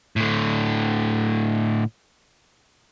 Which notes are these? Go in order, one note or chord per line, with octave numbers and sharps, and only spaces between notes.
A2 D3